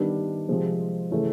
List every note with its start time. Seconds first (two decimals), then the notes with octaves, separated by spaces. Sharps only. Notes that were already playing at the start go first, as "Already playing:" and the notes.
Already playing: D#3 G3 B3 D4
0.49 C3 F3 G#3 C4
1.11 C#3 E3 A3 C#4